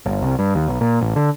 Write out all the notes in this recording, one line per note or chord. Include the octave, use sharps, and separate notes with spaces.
G1
C2
G2
D#2
B1
A#2
A1
D3